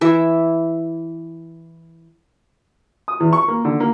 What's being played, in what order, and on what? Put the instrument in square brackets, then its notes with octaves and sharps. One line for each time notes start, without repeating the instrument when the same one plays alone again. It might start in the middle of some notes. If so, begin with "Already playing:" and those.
[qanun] E3 E4 E5
[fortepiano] D#6
E2
C#6
A#3
D3
A#3